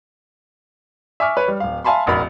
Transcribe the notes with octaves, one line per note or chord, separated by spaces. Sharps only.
E5 G#5 C#6 D6 F6
B4 C#5
G3
D1 F5
E5 F5 G#5 A5 B5 C6
E1 A1 F#4 A#4 B5